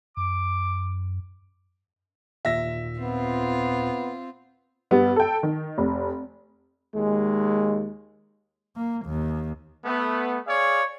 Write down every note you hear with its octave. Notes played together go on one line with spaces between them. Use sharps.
F#2 D6
D#2 A#2 E5 A#6
B3 C4 F4
G2 G3 B3
A4 G5
D#3
F1
D#2 G#3
A#3
D#2
A3 B3
G#4 C#5 D5 F5